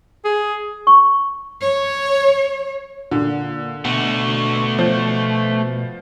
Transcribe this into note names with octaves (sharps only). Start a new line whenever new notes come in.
G#4
C#6
C#5
A#2 D3
B2 A3 F#4
F3